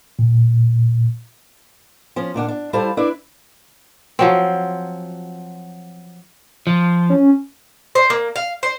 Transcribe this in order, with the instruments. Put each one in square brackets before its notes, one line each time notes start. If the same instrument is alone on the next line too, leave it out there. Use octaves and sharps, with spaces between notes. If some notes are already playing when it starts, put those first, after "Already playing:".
[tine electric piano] A#2
[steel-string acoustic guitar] F3 C#4
A#2 A#3 D4 F#5
D4
G3 E4 A4 C5 F5 A5
D4 E4 B4 D5
[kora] F3 F#3 C4
[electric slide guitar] F3
[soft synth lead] C#4
[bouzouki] C5
A#3
F5
C5